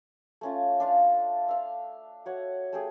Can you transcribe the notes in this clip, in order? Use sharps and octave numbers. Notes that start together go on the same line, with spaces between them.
A3 C#4 F4
D4 F4 F5
E5 F5
F#4 C#5 F#5
A3 G4 G#4